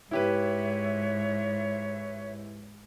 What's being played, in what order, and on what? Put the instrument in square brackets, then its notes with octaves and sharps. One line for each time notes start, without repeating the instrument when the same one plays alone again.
[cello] G#2 [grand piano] E4 G4 B4 [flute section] C#5 E5